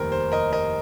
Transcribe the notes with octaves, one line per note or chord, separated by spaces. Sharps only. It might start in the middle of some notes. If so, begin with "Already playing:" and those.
Already playing: F1 D#2 D#3 G3 A#4 C5
C5
A#4 D#5
A#4 D#5